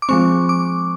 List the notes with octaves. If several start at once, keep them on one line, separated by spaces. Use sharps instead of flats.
D6
F3 G#3 C4 C#6
D6